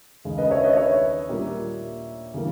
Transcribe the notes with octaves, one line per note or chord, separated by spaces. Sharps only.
D#2 C#3 G#3
B4 D#5
C#5 E5
B4 D#5
C#5 E5
A#2 G3 A#3
C#3 E3 G3 A#3